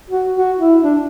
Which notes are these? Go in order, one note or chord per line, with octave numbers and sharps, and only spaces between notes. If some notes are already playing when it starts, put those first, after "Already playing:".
F#4
F#4
E4
D4